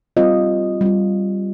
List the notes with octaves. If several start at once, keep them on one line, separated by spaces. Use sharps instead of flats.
G3 C4 F4 D#5
G3 C4 F4